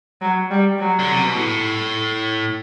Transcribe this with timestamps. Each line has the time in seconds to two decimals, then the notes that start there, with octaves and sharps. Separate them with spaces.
0.21 F#3
0.50 G3
0.78 F#3
0.99 D3
1.11 C3
1.23 B2
1.35 A2